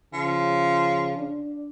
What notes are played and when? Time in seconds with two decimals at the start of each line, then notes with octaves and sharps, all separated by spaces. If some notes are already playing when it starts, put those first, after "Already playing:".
0.13 C#3 F3
1.17 D4